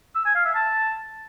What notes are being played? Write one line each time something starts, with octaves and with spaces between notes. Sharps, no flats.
E6
G#5
F5
E5
A5